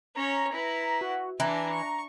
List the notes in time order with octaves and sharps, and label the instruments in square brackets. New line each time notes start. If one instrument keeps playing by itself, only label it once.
[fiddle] C#4 C#5 [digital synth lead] A#5
[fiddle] E4 B4
[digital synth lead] F#4
[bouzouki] E3 [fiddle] D4 G#5 [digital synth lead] A#5
[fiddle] C#6